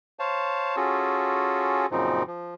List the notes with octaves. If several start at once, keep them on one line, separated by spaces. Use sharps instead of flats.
C5 C#5 F5 A5
C#4 F4 F#4 G#4 A4
F#2 A#2 C#3 F3 C4 D#4
F3